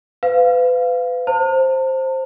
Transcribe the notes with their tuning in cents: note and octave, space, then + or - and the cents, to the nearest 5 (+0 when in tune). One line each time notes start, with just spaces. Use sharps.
B4 +30 F5 +0
C5 +10 A5 +45